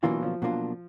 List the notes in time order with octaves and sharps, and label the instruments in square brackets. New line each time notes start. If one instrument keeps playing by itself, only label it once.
[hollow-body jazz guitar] B2 F#3 A#3 D4 F4 [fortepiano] E3
[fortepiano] F3
[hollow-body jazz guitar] B2 F#3 A#3 D4 F4